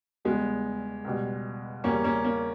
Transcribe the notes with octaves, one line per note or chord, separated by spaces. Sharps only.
E2 C#3 G3 G#3 B3
C#2 B2 G3
E2 C#3 G3 A#3 C#4
A#3 C#4
A#3 C#4